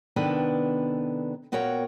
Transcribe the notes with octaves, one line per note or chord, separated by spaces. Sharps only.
C3 D#3 B3 D4 A4 B4
A#2 B3 F#4 A#4 C#5 G5